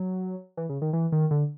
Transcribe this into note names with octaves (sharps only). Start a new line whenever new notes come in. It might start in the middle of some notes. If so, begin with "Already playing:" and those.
Already playing: F#3
E3
C#3
D#3
E3
D#3
D3